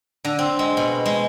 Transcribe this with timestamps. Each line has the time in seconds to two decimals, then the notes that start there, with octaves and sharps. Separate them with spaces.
0.25 D3
0.39 C4
0.59 G#3
0.77 B2
1.06 G#3